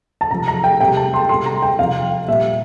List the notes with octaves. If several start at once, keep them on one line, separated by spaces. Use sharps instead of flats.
A5
C3 F3 A#5
A#5
G5
C3 G3 G5
A5
C6
C3 G3 C6
A#5
G5
C3 F3 F5
A#2 G3 E5